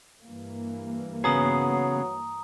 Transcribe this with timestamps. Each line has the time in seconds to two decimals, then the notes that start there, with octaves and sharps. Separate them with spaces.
0.25 G2 E3 A#3
1.24 C#3 F#3 B3 G#4 A#5 D#6